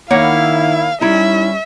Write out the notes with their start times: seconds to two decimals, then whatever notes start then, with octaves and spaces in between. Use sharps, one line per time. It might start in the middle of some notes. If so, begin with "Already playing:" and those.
0.10 D#3 A#3 E4 C#5 F5 F#5
1.01 G3 C#4 D#4 E4 E5